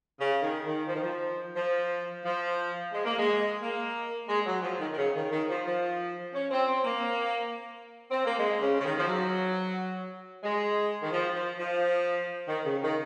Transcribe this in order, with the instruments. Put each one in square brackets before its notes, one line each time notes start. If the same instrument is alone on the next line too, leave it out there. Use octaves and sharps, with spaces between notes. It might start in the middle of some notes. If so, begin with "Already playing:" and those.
[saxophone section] C#3
D#3
D#3
F3
D#3
F3
F3
F3
G#3
A#3
G#3
A#3
G#3
F#3
F3
D#3
D#3
C#3
D#3
D#3
F3
F3
C#4
C4
C4
A#3
C4
A#3
G#3
C#3
C#3
D#3
F3
F#3
G#3
D#3
F3
F3
F3
D#3
C#3
D#3